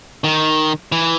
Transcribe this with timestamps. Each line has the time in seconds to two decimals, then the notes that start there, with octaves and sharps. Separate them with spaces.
0.24 D#3
0.92 E3